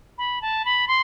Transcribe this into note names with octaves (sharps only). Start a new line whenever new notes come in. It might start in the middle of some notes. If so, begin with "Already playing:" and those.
B5
A5
B5
C6